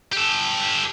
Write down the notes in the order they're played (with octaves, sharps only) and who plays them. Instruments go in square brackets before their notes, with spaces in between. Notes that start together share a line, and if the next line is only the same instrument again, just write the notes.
[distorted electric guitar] G4 A4